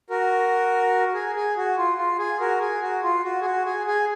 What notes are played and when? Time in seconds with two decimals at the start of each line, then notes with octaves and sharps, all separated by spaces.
0.10 F#4 A#4
1.14 G#4
1.35 G#4
1.57 F#4
1.78 F4
1.98 F4
2.18 G#4
2.40 F#4 A#4
2.61 G#4
2.82 F#4
3.03 F4
3.24 F#4
3.41 G#4
3.44 F#4
3.66 G#4
3.86 G#4